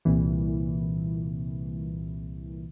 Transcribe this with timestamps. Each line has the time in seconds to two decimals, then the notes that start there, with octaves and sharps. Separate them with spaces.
0.05 C2 A#2 E3